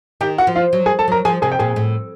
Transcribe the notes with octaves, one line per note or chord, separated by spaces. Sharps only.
D#3 G4 G5
F#4 F#5
F3
F4 F5
F#3
G#4 G#5
A4 A5
F#3 A#4 A#5
F3 G#4 G#5
C3 G#4 G#5
G5
A#2 G#4 G#5
A2